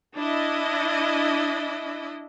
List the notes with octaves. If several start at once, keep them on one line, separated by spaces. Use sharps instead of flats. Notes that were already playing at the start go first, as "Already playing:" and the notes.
D4 E4 D#5